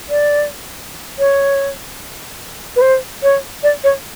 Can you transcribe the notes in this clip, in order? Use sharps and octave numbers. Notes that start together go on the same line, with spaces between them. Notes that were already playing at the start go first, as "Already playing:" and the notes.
D5
C#5
B4
C5
C#5
D5
C#5